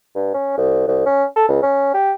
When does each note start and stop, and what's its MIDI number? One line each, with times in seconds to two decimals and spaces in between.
0.16 0.32 43
0.34 0.54 61
0.58 0.84 36
0.88 1.05 36
1.06 1.25 61
1.36 1.45 69
1.49 1.61 37
1.63 1.90 61
1.94 2.12 67